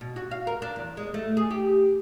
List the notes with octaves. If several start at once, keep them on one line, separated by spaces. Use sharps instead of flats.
B2
F#4
F5
A#4
D4
E2
G#3
A3
G#4
G4